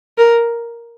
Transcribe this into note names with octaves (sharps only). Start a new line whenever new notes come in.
A#4